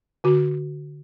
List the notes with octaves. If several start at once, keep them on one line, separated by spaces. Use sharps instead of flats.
D3 F#4